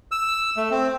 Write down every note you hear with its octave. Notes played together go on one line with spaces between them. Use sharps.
E6
A3
C4